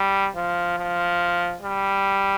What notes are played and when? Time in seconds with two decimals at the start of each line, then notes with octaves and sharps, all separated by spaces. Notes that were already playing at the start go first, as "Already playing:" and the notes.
Already playing: G3
0.36 F3
0.78 F3
1.62 G3